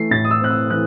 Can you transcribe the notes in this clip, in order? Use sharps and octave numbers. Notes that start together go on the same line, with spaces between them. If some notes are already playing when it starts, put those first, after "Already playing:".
Already playing: E3 A3 C7
A2 A6
D#6
E6
C4 F#6
E6
E3 F#6